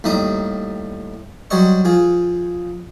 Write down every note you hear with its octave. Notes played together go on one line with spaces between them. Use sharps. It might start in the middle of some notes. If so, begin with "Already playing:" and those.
D#2 A2 G3 D#5 A#5 D#6
F#3 G3 C5 C#5 D#5 C#6
F3 G#4